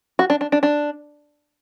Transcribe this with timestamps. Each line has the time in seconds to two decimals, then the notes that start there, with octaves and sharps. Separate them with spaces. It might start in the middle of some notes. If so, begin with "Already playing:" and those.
0.19 F#4
0.30 D4
0.41 D4
0.52 D4
0.63 D4